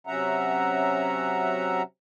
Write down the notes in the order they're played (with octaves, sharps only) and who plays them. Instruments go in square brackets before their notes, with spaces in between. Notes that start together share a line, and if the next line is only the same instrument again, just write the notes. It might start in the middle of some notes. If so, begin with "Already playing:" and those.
[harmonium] C3 F#3 C#4 E5 F#5 A#5